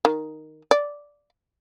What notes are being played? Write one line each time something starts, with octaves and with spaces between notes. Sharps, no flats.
D#3
D5